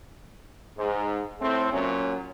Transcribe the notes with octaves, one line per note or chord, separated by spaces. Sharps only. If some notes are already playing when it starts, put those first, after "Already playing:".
G#2
A2 A3 C4
A#2 F#3 C#4